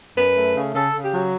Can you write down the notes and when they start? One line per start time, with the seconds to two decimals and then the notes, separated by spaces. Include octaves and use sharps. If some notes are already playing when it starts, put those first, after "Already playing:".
0.17 F#2 B4
0.37 A3
0.56 C#3
0.75 C#3 A4
0.94 C#3
1.04 G4
1.13 F#3